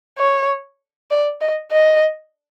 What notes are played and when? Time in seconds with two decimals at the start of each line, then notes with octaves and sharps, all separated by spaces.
0.18 C#5
1.11 D5
1.41 D#5
1.72 D#5